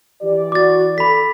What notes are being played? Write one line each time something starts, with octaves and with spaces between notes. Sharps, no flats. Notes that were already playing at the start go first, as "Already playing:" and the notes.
E3 G4 D5
F#4 D6 A6
A4 B5 B6